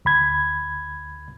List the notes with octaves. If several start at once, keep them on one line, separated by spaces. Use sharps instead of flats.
D2 B5 G#6